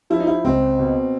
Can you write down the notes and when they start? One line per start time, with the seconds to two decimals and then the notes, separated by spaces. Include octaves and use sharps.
0.10 F3 E4
0.20 D#4
0.27 E4
0.44 C#2 C4
0.79 B2